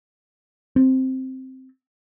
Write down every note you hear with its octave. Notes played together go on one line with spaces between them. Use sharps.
C4